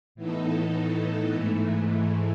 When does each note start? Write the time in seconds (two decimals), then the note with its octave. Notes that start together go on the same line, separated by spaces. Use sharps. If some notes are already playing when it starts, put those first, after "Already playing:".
0.15 A2 E3 B3 D#4 A4
1.31 G#2 E3 A3